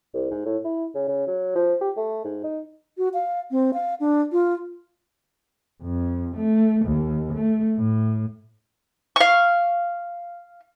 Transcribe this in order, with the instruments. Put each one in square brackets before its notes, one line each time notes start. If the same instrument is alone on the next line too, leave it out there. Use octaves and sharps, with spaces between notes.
[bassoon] C2
G#2
A2
E4
C#3
C#3
F#3
F3
G4
A3
G#2
D#4
[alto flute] F#4
F5
C4
F5
D4
F4
[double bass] F2
A3
D#2
A3
A2
[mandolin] F5 C#6